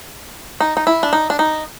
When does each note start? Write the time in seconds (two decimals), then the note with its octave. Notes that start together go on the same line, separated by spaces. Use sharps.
0.60 D#4
0.77 D#4
0.87 E4
1.03 D4
1.13 D#4
1.30 D4
1.39 D#4